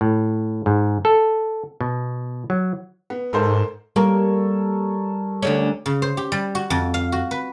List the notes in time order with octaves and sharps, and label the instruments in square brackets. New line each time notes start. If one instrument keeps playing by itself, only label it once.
[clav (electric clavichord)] A2
G#2
A4
B2
F#3
[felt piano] B3
[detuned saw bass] G#2 [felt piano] A4 A#4 C5
[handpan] G3 [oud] A#3 [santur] A4 A#4 C#5
[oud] D2 D3 C#4 [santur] D6
[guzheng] C#3
C5
G4
G3
F#4
F2
F5
F#4
B4